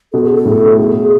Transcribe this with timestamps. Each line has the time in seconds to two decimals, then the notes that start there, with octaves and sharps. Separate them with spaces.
0.13 B2 A4
0.24 G#4
0.36 A4
0.45 A2
0.78 B2 G#4